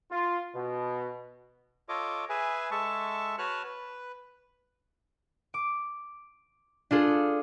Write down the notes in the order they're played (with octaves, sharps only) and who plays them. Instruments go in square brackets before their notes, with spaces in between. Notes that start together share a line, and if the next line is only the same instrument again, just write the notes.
[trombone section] F4
B2
[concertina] F4 A4 C#5 D#5 D6
G#4 B4 E5 G#5
G#3 A4 E5 A5 C#6
F#4 B4 C#5 A5 F6 F#6
B4
[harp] D6
D4 F4 G#4 A4